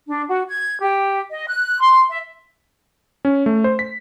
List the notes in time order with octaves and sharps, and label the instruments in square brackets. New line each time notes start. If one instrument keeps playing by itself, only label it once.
[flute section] D4
F#4
G#6
G4
D#5
F#6
C6
E5
[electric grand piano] C#4
A3
C5
B6